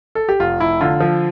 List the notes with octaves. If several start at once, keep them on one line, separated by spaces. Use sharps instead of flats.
A4
G4
F1 F4
F1 E4
D3 F4
F3